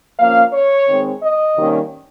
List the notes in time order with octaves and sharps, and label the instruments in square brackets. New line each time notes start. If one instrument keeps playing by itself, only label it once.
[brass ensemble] F3 A#3 C#4 F5
C#5
D#3 G#3 C4
D#5
C3 D#3 G3 A#3 C#4